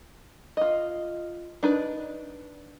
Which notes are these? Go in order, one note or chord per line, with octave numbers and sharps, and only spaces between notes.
F4 D#5
D4 D#4 B4